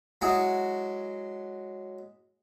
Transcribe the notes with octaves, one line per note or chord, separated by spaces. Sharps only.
F#3 G#3 E4 F#4 G#4